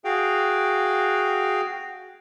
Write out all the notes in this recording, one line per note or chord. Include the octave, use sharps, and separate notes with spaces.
F#4 G#4 F5 G5